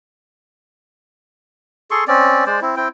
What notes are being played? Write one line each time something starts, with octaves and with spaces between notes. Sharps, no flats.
G#4 A4 C6 C#6
C4 C#4 D5
G#3 C5 D5
C4 E4
C4 E4 G5